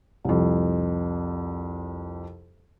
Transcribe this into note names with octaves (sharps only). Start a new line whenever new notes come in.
C2 F2